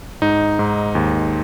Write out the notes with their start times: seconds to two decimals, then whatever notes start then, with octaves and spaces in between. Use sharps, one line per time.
0.22 G#2 D#4
0.59 G#2
0.95 D#2